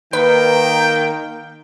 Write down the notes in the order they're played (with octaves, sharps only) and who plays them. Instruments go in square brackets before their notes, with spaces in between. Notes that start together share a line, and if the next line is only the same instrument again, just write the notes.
[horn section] D#3 [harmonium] A#3 [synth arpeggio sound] B4 [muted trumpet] G5